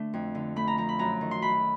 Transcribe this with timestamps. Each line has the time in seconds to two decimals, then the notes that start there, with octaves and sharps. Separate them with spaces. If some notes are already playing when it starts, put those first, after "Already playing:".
Already playing: D3 A3 D4
0.14 F2
0.35 D3
0.56 A3 B5
0.68 A#5
0.78 F3 A#5
0.89 B5
0.99 F#2 A#5
1.21 D#3
1.31 C6
1.42 F#2 B5